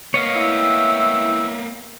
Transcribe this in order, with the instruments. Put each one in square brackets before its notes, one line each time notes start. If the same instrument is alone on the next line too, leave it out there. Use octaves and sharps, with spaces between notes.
[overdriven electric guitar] A#3 B3 [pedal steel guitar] C#5 D#5 F5
[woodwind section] E4 G5 E6